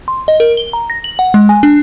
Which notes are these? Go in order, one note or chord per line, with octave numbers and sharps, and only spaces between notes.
C6
D#5
A#4
G7
A#5
A#6
F#7
F#5
G#3
G#5
D4